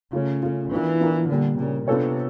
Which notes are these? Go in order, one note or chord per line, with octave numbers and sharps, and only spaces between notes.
C#3 A3 C#4 F4
A3 C#4 F4
E3 B3 D4 F4 A#4
B3 D4 F4 A#4
A#2 D3 G3 A#3
A#2 C#3 G3 A#3
C3 B3 D4 F4 A4 C#5